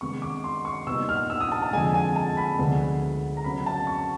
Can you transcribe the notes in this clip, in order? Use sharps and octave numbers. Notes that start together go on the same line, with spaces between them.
C3 D#3 G#3 B3 D4 C#6
D6
C6
C#6
A#2 G3 B3 D#4 E6
F6
E6
D#6
A5
A5
F2 D3 F3 G#3 G#5
G#5
A5
B5
D2 D3 F3 G#3 B3
A#5
C#3 F#3 B3 B5
A5
C#6